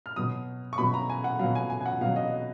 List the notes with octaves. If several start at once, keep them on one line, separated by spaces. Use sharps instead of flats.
F6
B2 F#3 D#6
C#6
B2 F#3 B5
A#5
G#5
F#5
B2 F#3 F5
G#5
G#5
G#5
F#5
B2 F#3 F5
D#5